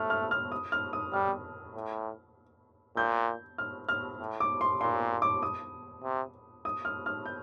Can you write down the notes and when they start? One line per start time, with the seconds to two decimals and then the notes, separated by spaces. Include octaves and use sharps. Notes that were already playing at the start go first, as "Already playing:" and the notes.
Already playing: A3 F6
0.10 F6
0.31 F6
0.52 D#6
0.72 F6
0.93 D#6
1.13 G3 F6
1.74 A2
2.96 A#2 G6
3.58 F6
3.89 F6
4.19 A2
4.40 D6
4.61 C6
4.81 A#2 C6
5.22 D6
5.43 D#6
6.03 C3
6.65 D#6
6.85 F6
7.06 F6
7.26 G6